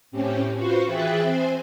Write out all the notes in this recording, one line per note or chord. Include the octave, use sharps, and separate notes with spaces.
A2 C4 C#4 G4
F4 F#4 B4 C5 C#6
E3 G#4 E5 G5 F#6 A6
C4 C5 G#5